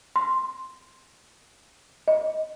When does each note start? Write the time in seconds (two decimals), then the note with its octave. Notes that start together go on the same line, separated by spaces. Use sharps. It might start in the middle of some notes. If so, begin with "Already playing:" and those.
0.16 C6
2.08 D#5